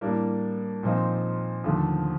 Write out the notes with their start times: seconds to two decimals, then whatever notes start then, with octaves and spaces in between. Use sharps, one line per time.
0.01 A2 G3 A#3 D4
0.83 A#2 F3 C4 D#4
1.64 D#2 D3 F3 A3